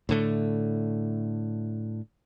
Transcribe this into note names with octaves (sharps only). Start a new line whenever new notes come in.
A2 D3 A3